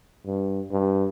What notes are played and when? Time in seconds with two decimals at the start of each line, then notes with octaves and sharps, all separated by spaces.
0.26 G2
0.72 G2